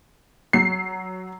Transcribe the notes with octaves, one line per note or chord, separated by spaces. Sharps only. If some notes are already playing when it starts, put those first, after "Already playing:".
F#3 C7